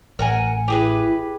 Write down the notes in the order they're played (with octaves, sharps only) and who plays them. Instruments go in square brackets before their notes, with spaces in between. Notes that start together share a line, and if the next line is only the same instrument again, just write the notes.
[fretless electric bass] A1 [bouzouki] A#4 F#5 G#5
[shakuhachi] E4 [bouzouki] G4 G#4 B4